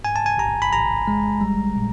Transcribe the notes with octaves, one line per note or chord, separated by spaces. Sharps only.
G#2 G#5
A5
G#5
A1 A#5
B5
A1 A#5
G#3
G3
A#2